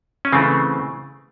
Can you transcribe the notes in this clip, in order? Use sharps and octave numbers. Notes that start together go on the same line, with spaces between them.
C#4
C#3 E3 A3 C4